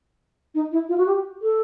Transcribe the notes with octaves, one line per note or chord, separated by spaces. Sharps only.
D#4
E4
F4
F#4
G4
A4